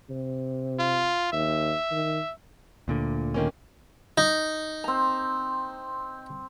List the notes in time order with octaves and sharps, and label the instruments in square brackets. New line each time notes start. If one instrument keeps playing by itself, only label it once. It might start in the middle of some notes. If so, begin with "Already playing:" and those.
[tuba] C3
[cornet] F4
[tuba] D#2 [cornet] E5
[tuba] D#3
[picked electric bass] D2 A#2 D3
[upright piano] D#3 A#3 C#4
[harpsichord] D#4
[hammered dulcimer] C4 A#5